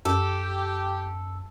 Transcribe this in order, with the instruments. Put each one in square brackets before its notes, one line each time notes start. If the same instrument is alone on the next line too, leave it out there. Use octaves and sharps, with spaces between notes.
[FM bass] F#2 [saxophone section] G4 [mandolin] A4